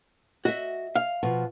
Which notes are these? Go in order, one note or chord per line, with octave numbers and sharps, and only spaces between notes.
F#4 D#5 E5
F5
B2 F3